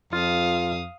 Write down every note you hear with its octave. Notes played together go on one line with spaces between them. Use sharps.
F2 F4 F5 D#6